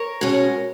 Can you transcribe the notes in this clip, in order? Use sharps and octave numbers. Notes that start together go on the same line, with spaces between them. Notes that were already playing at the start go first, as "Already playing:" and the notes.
Already playing: A#4 C#5
B2 G#3 C#4